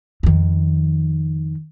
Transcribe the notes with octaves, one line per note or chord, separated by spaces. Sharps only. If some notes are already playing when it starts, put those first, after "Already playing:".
F2 D#3